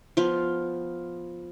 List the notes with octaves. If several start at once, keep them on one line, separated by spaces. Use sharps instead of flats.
F3 B3 F4